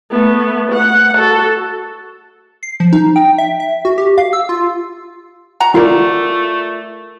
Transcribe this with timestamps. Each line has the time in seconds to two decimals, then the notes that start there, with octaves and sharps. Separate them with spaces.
0.11 A3 B3
0.72 F#5
1.16 F#4 A4
2.63 C7
2.80 F3
2.93 D#4
3.16 G5
3.38 E5
3.60 E5
3.85 F#4
3.98 G4
4.18 F5
4.33 E6
4.49 F4
5.60 F#4 F#5 A#5
5.75 A3 F4 A#4 D5